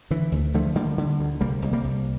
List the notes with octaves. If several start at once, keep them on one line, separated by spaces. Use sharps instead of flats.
D3 E3
D2
D3 F3 A3
D3 G3 A#3
D3
D2
C2 G3 A#3
C2
G3 A#3
C2